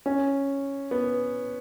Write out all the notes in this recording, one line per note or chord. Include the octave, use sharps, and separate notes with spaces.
C#4
B3